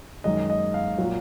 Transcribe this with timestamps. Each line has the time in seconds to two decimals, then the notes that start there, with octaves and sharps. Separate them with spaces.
0.24 F#2 D#3 G#3 D#5
0.50 D#5
0.74 F5
0.98 A#2 F#3